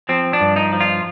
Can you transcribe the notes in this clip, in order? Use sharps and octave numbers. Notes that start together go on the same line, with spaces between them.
F3 C4
D4
G2
D#4
F3
F4